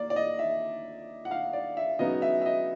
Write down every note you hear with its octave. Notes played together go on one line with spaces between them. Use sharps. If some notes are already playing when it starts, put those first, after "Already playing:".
Already playing: A#3 D5
D5
D#5
E5
F#5
F5
D5
E5
C#3 F#3 B3 D#4 D#5
E5
E5
D#5